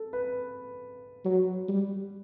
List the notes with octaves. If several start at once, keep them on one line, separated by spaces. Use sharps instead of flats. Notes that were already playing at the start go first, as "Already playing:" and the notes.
Already playing: A4
B4
F#3
G3